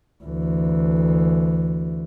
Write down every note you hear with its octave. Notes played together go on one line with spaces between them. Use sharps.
D2 E3